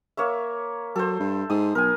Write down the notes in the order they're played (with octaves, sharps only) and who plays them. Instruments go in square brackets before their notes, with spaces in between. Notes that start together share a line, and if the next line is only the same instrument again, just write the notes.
[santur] A#3 C#5 E5
[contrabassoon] F#3 [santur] A4 C5
[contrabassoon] G2
[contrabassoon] G#2 [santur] D#6
[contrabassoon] B1 [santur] A#4 G#5